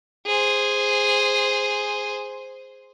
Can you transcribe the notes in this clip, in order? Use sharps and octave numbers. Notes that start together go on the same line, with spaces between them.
G#4 C5